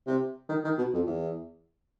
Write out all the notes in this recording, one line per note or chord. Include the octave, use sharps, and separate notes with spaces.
C3
D#3
D#3
B2
F2
E2